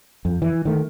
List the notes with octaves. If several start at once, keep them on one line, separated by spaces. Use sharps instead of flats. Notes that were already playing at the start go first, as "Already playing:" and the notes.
F2
E3
D#3 A3